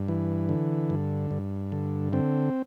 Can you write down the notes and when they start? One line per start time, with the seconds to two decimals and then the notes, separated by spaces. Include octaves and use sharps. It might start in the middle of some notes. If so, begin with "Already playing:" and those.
Already playing: G2
0.08 E3
0.49 D3
0.90 G2
1.31 G2
1.72 D3
2.13 D3 C4